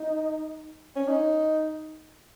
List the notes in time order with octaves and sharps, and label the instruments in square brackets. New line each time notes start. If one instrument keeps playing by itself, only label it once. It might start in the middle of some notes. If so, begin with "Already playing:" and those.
Already playing: [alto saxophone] D#4
C#4
D#4